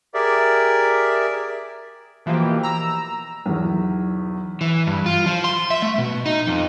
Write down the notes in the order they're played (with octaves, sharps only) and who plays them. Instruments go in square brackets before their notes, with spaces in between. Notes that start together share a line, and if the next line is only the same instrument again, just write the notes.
[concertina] G4 G#4 A#4 D5 E5
[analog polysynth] B2 E3 F3 A#3 G4
A#5 E6
[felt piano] B1 E2
[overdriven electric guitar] E3
G2
F4
F3
C6
E5
A3
B2
D#4
F2